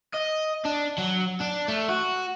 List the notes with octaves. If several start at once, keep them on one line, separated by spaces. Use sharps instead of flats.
D#5
D4
F#3
D4
A3
F#4